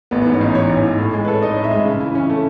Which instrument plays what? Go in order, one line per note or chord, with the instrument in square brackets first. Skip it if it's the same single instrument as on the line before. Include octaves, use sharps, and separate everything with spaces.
[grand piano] A1 [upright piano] B3
[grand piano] G#2 [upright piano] B3
[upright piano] C#4
[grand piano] A1 [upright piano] D#4
[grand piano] E3 [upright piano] C#5
[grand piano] A1
G#2
A2
G#3
[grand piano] A4 [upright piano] B4
[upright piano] C#5
[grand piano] D#4 [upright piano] D#5
[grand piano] A2
[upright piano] E5
[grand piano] G#3
C#3
E3
C#4
A3